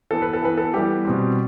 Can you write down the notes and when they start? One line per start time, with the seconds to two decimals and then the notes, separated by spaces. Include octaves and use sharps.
0.11 E3 B3 A4
0.22 B4
0.33 A4
0.42 E3 B3 B4
0.57 A4
0.74 E3 G3 B3 G4
1.05 B2 G3 C4